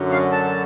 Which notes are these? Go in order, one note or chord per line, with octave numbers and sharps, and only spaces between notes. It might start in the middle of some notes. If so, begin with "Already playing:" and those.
Already playing: F#2 D3 F#3
F5
A5